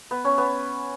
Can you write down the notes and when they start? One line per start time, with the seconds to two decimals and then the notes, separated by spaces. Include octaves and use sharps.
0.11 B3
0.25 C#4
0.38 B3